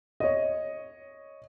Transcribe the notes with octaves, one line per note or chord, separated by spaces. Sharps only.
C#5 D#5